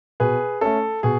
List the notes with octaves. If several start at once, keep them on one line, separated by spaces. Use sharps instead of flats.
B2 G#4 B4
A3 C#4 A4
B2 G#4